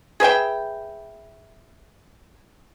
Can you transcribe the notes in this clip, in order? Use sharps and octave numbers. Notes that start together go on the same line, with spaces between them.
G#4 B4 E5 G5